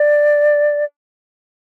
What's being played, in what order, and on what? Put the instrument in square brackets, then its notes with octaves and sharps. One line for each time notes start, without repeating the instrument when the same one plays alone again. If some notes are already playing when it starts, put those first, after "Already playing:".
Already playing: [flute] D5